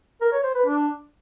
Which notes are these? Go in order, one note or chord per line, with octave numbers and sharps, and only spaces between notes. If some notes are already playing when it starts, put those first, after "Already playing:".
A#4
C#5
C5
B4
D4